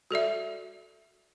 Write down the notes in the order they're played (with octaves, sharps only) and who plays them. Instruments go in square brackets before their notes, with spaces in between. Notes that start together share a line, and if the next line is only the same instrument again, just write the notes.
[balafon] F#4 A4 D5 E5